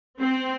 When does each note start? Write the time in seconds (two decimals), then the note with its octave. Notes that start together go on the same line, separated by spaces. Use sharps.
0.21 C4